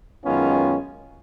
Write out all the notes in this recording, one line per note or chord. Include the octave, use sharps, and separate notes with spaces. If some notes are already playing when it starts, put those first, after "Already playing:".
F#2 D#3 G#3 B3 C#4 F4